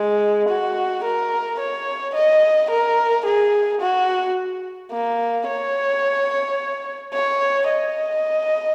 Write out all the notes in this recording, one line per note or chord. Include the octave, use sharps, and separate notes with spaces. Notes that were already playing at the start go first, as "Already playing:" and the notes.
Already playing: G#3
F#4
A#4
C#5
D#5
A#4
G#4
F#4
A#3
C#5
C#5
D#5